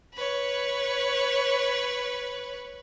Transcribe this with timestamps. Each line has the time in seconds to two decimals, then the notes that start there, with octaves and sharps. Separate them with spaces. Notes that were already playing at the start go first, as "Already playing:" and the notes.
0.14 B4 C#5